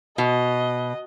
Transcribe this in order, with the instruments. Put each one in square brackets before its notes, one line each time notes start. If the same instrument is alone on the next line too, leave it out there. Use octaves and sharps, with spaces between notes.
[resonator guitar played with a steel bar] B2 [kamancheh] D#5